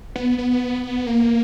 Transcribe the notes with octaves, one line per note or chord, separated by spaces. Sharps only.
B3
B3
A#3